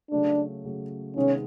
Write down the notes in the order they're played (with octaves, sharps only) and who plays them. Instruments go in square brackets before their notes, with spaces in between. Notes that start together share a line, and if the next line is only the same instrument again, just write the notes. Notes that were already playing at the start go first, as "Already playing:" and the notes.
[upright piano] C#3 F#3 A3 [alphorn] D4
[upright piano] C#3 F#3 A3
[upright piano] C3 D#3 G#3 B3 [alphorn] C#4